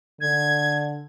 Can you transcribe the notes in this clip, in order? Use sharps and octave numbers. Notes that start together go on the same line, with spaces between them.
D3 G#6